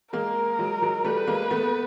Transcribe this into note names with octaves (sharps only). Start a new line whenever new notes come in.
G#3 A#3 A#4
F#3 G#3
F#3 G#3
G3 A3 B4
G#3 A#3
A3 B3